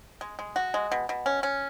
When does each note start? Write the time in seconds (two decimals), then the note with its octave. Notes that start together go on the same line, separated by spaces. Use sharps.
0.21 G#3
0.39 G#3
0.56 F#4
0.74 G#3
0.92 B2
1.09 B2
1.26 C#4
1.43 C#4